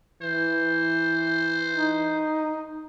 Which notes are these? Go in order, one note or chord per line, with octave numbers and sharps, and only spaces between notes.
E3 C5
D#4